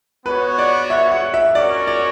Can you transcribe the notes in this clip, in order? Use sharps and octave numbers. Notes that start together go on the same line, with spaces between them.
B3 F#4 B4 C#5
D5
E5
F#5
E5
C#4 F#4 A#4 C#5 D5
D5